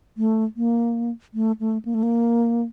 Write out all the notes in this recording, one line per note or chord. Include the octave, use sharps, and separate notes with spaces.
A3
A#3
A3
A3
A#3
A3
A#3